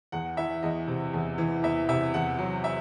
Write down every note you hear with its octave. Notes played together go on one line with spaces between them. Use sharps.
E2 F#5
E3 E5
E2 D#5
C3
E2
E3
E2 E5
C3 E5
E2 F#5
F#3
E5